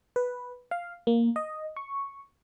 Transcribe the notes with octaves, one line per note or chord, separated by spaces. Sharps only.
B4
F5
A#3
D#5
C#6